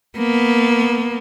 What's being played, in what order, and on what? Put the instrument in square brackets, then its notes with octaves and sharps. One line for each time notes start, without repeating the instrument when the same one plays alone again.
[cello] A#3 B3